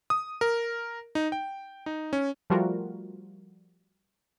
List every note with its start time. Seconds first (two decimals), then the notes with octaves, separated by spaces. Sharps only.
0.10 D#6
0.41 A#4
1.15 D#4
1.32 G5
1.86 D#4
2.13 C#4
2.50 F3 G3 A3 F4 F#4 A#4